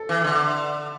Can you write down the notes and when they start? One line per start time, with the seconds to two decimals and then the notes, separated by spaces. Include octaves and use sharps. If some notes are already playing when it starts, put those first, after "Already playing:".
Already playing: A4
0.09 E3
0.24 D3